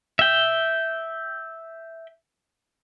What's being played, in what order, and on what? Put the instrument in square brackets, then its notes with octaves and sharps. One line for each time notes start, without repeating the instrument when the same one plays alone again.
[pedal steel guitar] E5 G5